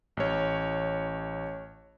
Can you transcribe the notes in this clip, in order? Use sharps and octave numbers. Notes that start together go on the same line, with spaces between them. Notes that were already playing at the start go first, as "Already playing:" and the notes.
A1 C#5